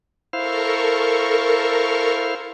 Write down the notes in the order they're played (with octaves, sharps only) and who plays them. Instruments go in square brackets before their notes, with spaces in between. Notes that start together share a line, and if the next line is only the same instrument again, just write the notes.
[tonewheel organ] E4 C5 F5 [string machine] A4 A#4 C#6